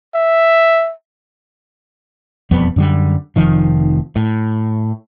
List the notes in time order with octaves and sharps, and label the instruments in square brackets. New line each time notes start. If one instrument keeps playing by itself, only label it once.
[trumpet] E5
[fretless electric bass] E1 F2 G3 B3
F#2 D3 G3
F1 D#3 F3
A2